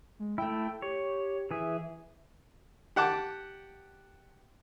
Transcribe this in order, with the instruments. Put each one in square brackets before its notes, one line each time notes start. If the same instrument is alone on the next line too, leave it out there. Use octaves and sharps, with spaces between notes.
[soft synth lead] G#3
[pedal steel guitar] A3 E4 [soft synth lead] G5
[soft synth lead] G4 [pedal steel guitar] C#5
[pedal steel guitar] E3 G#4 [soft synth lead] E5
[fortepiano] G4 F#5 A5 D6